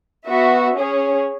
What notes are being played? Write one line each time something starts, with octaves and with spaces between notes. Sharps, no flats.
B3 F#4 E5
C#4 G#4 C#5